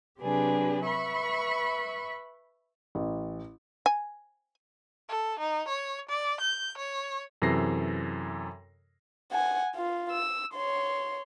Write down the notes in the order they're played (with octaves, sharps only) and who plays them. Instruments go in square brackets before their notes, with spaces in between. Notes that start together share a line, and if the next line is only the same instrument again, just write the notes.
[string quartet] C3 F#3 D4 G4 G#4 B4
B4 E5 B5 C#6
[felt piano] A1
[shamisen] G#5
[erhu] A4
D#4
C#5
D5
G6
C#5
[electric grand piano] F#2 C3 E3 A4 A#6 C7
[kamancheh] F#5 G#5
F4
E6
C#5 C6